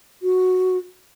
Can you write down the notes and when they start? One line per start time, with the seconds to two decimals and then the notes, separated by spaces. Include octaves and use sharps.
0.22 F#4